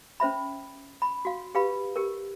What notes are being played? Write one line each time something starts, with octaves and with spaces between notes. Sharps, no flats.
C#4 C5 E5 B5
B5
F#4 F5
G4 B4 F5 B5
G4 A#4